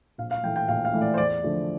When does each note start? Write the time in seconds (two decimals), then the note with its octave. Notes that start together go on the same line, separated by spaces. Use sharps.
0.18 A#1 F5
0.31 F5
0.43 A2 E3 A3 G5
0.56 G5
0.68 A#1 F5
0.85 F5
0.93 A2 E3 A3
1.01 D5
1.14 C5
1.18 E2 D5
1.43 D3 F3 A3